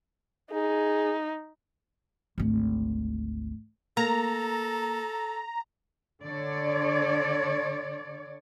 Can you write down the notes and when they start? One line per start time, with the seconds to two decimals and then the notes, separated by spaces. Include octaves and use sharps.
0.52 D#4 G#4
2.38 G#1 D2
3.97 A#3 A4 A#5
6.25 D3 C#5 D5